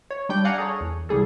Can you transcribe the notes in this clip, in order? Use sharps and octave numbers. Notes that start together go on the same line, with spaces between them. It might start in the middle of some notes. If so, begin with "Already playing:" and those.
C#5
G3 D4 G5 G6
D5 F5 F#5 G#5 A#5
G#4 A4 C#5
E2
C2 G3 G#4 A4